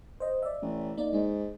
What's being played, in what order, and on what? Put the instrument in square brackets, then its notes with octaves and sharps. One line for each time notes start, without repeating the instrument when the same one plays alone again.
[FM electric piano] C5 D#5
D5 E5
[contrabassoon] A1
[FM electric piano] A#3 D#4 D5
[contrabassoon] G#2 [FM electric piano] D#4